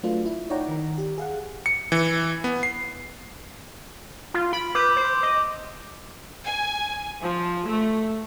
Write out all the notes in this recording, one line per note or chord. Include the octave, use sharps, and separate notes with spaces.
F#3 A3 D4 F4 B4
E4
D#4 C#5 D5 F#5 G5 A#5
D#3 A#5
G4
G#4 F5 F#5
C#7
E3
B3
C7
F4
B5 D7 F#7
B4 D6 E6 G6
C5
D#5
G#5
F3
A3